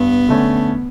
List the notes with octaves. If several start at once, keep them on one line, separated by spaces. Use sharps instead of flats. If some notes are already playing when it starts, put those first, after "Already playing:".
Already playing: G2 B3
D3 A3 C#4